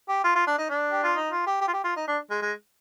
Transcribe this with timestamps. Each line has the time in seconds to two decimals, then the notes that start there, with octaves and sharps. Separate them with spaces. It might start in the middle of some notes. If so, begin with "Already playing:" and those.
0.09 G4
0.24 F4
0.36 F4
0.47 D4
0.58 D#4
0.70 D4
0.91 G4
1.03 F4
1.16 D#4
1.31 F4
1.46 G4
1.61 G4
1.68 F4
1.73 G4
1.84 F4
1.96 D#4
2.07 D4
2.30 G#3
2.42 G#3